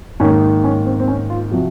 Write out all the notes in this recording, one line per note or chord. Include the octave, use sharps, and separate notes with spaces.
G#2 D#3 A#3 C#4
C#4
C4
C4
C#4
F4
C3 F3 F#4